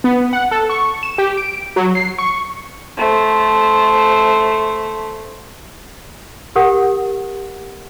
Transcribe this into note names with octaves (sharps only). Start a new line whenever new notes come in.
B3
F#5
A4
C#6
E7
G4
D7
F#3
C7
C#6
A3 C5
G4 A#4 F#5 D#6